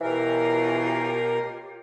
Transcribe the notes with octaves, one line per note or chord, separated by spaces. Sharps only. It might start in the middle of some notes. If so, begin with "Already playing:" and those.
B2 E3 F4 G4 A#4 C#5